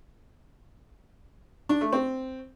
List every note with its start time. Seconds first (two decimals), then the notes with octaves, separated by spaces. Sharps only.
1.69 D4
1.81 A3
1.93 C4